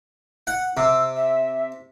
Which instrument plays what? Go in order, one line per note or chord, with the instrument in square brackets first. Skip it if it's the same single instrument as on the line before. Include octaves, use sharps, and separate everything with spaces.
[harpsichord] F#5
[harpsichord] C3 [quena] E6
[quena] E5